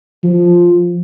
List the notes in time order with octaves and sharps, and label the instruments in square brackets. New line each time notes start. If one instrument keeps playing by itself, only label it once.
[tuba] F3